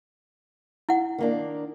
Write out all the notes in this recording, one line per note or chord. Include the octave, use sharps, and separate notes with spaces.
E4 F#5
D#3 A#3 D4